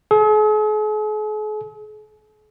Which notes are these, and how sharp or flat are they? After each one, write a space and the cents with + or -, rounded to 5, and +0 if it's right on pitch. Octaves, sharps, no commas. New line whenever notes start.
G#4 +45